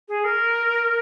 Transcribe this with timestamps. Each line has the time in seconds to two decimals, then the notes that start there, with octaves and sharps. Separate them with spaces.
0.08 G#4
0.24 A#4